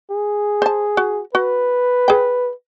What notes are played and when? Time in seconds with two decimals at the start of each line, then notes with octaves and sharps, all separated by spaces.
0.11 G#4
0.62 C5 A5
0.97 F#4
1.35 F#4 B4
2.08 G#4 G5